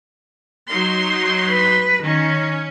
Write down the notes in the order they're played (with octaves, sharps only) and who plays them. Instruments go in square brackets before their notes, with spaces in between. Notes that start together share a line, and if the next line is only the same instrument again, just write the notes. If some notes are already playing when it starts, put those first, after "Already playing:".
[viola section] F#3 D#4 C6
[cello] B4
[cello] D#3 [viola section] C#4